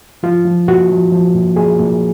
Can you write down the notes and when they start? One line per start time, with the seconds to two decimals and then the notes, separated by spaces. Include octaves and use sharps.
0.23 F3 F4
0.46 F3
0.68 A#2 F#4
0.90 F3
1.12 F3
1.35 A#2
1.56 A#2 G#4
1.80 A#2